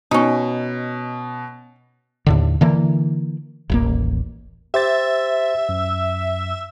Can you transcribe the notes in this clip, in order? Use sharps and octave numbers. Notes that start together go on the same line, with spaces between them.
B2 C#4 D#4
D#2 A2 D3
D3 E3 A#3
D#1 A1 A#3
G4 C5 E5 A6
F#2